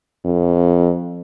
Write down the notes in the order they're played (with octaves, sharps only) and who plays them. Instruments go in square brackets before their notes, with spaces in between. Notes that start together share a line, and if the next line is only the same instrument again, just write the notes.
[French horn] F2